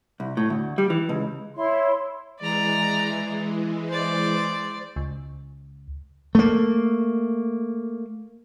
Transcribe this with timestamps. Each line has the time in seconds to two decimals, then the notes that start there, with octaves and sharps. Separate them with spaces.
0.20 C2
0.37 A2
0.50 D2
0.78 G3
0.90 E3
1.09 C#2
1.55 E4 C#5 C6
2.40 E3 G#3 D5 A#5
3.88 C5 D5
4.96 C#2
6.35 A3 A#3